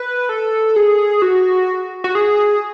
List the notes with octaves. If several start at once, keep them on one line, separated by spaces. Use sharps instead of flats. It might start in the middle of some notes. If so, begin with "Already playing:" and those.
Already playing: B4
A4
G#4
F#4
F#4
G#4